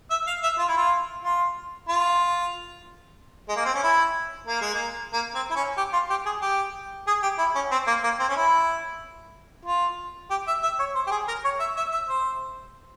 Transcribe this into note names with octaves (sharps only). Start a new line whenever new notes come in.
E5
F5
E5
F4
E4
F4
F4
F4
G#3
A#3
C4
C#4
E4
A#3
G#3
A#3
A#3
C4
E4
C#4
G4
F4
G4
G#4
G4
G#4
G4
E4
C#4
C4
A#3
A#3
C4
C#4
E4
F4
G4
E5
E5
C#5
C5
G4
G#4
A#4
C#5
E5
E5
E5
C5